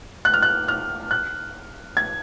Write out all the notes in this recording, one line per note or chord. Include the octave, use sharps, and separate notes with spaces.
F#6
F6
F#6
F6
F#6
G#6